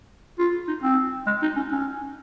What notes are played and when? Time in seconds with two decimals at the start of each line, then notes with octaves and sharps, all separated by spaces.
0.39 F4
0.68 D#4
0.83 C4
1.27 G#3
1.42 D#4
1.57 C#4
1.72 C#4